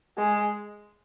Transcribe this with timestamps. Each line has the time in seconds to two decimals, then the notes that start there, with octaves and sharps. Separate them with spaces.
0.18 G#3